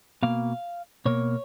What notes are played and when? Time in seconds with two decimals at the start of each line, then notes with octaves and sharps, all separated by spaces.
0.23 B2 A#3 F5
1.05 B2 A#3 C#5